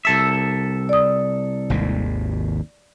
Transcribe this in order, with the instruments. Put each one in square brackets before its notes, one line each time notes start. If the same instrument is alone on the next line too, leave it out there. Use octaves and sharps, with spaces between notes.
[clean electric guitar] C2 A4 E5
[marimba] D5 D#6
[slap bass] G#1 D#2 C3